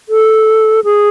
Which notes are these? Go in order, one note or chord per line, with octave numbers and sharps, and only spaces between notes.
A4
G#4